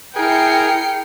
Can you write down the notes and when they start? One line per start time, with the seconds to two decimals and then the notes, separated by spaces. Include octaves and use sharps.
0.16 E4 G#4 A#4 G5 C7 C#7